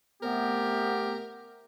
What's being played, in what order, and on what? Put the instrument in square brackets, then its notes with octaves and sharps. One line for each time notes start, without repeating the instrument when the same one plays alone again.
[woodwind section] C3 A3 B3 [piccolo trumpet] G4 [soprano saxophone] A#4